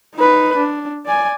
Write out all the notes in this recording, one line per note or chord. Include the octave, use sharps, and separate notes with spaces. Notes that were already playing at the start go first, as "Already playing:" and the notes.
D#4 B4
D4
D5 G#5